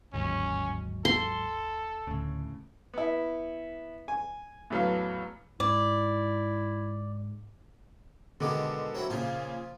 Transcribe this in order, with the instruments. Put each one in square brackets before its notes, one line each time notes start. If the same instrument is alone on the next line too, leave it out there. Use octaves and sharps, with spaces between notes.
[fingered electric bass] G1 D#2 [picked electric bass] G#2 F#3 [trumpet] C#4
[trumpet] A4 [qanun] C6
[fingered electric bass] D2 [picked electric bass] A2 C#3
[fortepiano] B3 E4
G#5
E2 A2 F#3 B4 F5
[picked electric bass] G#2 [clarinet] E4 [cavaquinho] D5
[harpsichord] B2 D#3 G#3 [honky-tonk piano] D3 D6
[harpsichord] F#3 C4 E4
[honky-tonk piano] A#2 C#3 [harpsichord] F3 F4